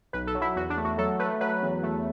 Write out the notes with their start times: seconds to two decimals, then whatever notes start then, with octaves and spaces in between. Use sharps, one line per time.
0.13 B1 B4
0.27 A4
0.35 F#3
0.41 E4
0.56 E2 F#4
0.70 D4
0.77 A3
0.85 F#4
0.98 F#3 A4
1.19 A3 B4
1.41 F#3 B4
1.63 E2
1.83 A3